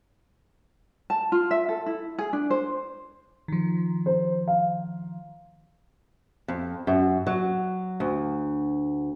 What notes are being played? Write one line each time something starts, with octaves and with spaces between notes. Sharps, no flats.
A5
F4
E5
A4
E4
G#4
D4
C5
D#3 F3
C5
F5
F2
F#2
F#3
D2